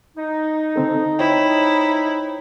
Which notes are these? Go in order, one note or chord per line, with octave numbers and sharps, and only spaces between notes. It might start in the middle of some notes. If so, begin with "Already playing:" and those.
D#4
D3 C4 A4
E4 C5 C#5 G5